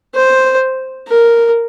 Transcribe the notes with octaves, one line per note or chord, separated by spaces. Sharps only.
C5
A#4